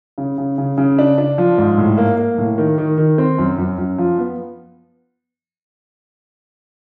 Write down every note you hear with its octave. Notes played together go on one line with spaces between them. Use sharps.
C#3
C#3
C#3
C#3
D4
D4
F3
G#2
A2
A#3
A#3
A2
D#3
D#3
D#3
C4
F#2
F#2
F#2
F3
B3